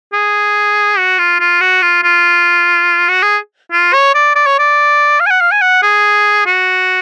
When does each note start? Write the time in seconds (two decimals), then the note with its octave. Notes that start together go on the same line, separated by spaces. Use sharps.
0.13 G#4
0.98 F#4
1.19 F4
1.40 F4
1.61 F#4
1.82 F4
2.03 F4
3.09 F#4
3.23 G#4
3.72 F4
3.93 C#5
4.14 D5
4.36 D5
4.47 C#5
4.59 D5
5.20 F5
5.26 G#5
5.30 F#5
5.41 F5
5.52 G#5
5.62 F#5
5.83 G#4
6.46 F#4